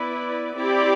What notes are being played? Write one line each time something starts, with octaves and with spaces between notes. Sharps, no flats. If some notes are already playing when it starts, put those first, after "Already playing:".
Already playing: B3 E4 B4 D5
C4 E4 G4 D5